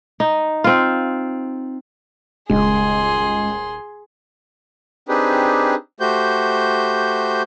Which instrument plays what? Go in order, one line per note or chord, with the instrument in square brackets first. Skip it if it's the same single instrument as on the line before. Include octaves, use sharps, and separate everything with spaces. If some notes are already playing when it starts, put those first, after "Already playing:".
[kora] D#4
C4 F4
[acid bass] D#1 [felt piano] C#2 [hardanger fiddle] G#4 C6
[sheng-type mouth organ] C4 D4 D#4 G4 G#4 B4
A3 F#4 G4 C5 G6